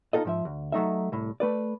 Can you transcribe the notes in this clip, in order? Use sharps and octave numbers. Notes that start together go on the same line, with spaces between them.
D#4 F4 G#4 A4 D#5
G#2 F3 E5
D2
F#3 A3 D#4 E5
C2 A2
A3 B4 D5